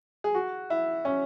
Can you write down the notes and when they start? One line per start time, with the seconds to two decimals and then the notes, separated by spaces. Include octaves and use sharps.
0.24 G#4
0.35 F#4
0.70 E4
1.05 C#4